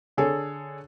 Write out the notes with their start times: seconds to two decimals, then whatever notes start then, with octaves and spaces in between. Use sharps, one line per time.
0.17 D3 G#4 A4 C#5